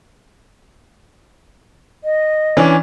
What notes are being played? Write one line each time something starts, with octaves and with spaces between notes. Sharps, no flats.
D#5
E3 C#4 D4